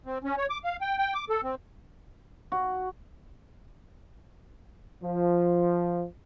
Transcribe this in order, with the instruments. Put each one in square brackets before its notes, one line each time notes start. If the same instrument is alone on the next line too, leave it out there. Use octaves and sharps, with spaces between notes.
[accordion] C4
C#4
C#5
D6
F5
G5
G5
D6
A4
C4
[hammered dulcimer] F#4
[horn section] F3